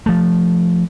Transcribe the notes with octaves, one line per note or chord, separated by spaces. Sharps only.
F3 A3